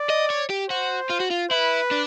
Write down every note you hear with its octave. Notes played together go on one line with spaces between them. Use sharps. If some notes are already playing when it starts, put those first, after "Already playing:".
Already playing: D5
D#5
C#5
G4
F#4 C5
F4
F#4
F4
E4 B4
D4